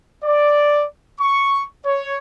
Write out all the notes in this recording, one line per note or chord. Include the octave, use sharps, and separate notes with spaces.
D5
C#6
C#5